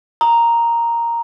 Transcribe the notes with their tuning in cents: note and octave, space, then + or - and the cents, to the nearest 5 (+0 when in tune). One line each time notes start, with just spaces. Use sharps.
A#5 +0 D#6 +10